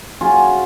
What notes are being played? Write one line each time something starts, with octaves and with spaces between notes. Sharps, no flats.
F#3 C#4 F4 G#4